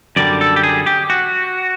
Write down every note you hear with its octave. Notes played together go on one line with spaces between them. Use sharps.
F#2 D3 G3 D5
A4
G4
G#4
G4
F#4